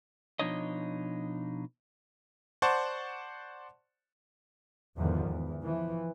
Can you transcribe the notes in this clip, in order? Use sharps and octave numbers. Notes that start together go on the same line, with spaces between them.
B2 F3 D4 D#4 C#5 D#5
C5 D5 F#5 A5 C#6
E2 G#2 D3 D#3 F3
E2
E3 F3